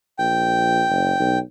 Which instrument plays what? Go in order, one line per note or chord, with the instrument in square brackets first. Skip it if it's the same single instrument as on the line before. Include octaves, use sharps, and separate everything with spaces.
[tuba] A#1 [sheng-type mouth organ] G5
[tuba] F#1
B1